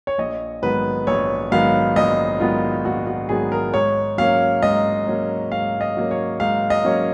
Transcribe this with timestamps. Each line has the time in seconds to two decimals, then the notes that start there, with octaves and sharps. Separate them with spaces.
0.07 C#5
0.18 A#1 D#5
0.62 G#2 D#3 F#3 B3 B4
1.07 A#1 C#5
1.51 G#2 D#3 F#3 B3 F5
1.96 A#1 D#5
2.40 G#2 D#3 F#3 B3 F4
2.85 A#1 F#4
3.07 F#4
3.29 G#2 D#3 F#3 B3 G#4
3.52 A#4
3.74 G#2 C#5
4.18 F#3 A#3 C#4 F5
4.62 G#2 D#5
5.07 F#3 A#3 C#4
5.52 G#2 F5
5.81 D#5
5.97 F#3 A#3 C#4
6.11 C#5
6.40 G#2 F5
6.70 D#5
6.84 F#3 A#3 C#4